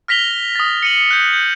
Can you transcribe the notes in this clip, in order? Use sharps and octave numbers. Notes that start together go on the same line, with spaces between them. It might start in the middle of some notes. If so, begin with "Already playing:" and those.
F6 A#6 B6 F7 G7
D#6 A6
C#7 D#7 F#7
F#6 G6
G6